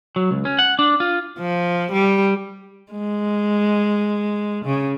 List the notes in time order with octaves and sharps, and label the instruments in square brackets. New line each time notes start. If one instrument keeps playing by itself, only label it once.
[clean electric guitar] F#3
C#2
C#4
F#5
D4
F4
[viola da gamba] F3
G3
G#3
C#3